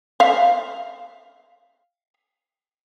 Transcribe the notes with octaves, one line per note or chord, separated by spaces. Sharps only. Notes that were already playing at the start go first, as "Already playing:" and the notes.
E5 F5